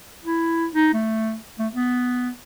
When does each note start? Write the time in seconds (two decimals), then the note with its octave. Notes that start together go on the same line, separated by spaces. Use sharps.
0.25 E4
0.75 D#4
0.94 A3
1.59 A3
1.73 B3